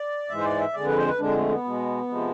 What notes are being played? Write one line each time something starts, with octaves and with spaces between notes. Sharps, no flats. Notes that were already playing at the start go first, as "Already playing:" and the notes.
Already playing: D5
G#2 E3 G#3 E5
C5
D5
E5
F2 D3 G#3 D5
B4
C5
B4
F2 D3 G#3 D4
A3
B3
B2 G#3
C3 F3 G#3